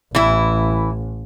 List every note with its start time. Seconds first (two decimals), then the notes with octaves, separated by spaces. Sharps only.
0.15 A1 E3 E4